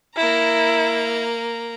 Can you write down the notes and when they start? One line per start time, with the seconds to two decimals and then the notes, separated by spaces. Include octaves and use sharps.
0.17 A#3 E4 A#5